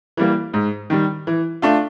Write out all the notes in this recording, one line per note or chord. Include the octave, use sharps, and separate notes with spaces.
E3 G3 A#3
G#2
D#3 G3
E3
A3 D4 F4